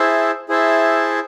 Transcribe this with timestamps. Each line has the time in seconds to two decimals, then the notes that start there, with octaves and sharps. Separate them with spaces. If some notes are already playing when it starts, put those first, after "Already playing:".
Already playing: E4 G#4 C5 E5 A5
0.49 E4 G#4 C5 E5 A5